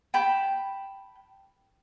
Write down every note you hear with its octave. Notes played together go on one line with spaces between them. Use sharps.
G5 A5 B5 G6